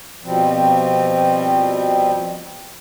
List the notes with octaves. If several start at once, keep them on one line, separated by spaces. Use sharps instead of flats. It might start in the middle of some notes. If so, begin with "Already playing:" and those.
B2 F3 G3 C4